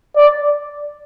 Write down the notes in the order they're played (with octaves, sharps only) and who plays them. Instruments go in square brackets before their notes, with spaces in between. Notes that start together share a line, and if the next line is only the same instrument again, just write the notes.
[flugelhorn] D5